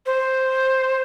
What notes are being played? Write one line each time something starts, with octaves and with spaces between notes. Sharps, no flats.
C5